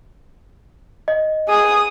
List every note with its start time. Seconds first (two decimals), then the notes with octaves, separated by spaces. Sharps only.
1.08 D#5
1.48 G#4 D#6